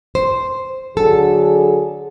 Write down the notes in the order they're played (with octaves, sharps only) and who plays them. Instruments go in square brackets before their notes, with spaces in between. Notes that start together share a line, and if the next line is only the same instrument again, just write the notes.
[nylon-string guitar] C5
[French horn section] D3 F#3 G#4 [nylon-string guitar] A4